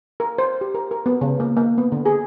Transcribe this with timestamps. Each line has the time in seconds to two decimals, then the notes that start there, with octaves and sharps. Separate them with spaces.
0.20 A#4
0.38 C5
0.61 G4
0.75 A#4
0.91 A#4
1.06 B3
1.21 C#3
1.40 A#3
1.57 A#3
1.78 B3
1.92 D3
2.06 G#4